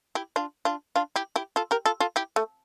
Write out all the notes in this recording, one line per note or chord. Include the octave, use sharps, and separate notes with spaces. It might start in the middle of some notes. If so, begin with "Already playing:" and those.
E4 G4
D4 F4
D4 F4
D4 F4
E4 G4
E4 G4
F4 A4
G4 A#4
F4 A4
F4 A4
E4 G4
A3